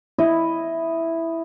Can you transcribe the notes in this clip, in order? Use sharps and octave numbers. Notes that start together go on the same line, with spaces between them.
E4 D#5